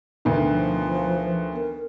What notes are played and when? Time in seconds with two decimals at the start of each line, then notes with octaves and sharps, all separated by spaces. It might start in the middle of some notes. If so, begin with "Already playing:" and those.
0.25 D2 B2 D#3
0.51 F3
1.56 A#4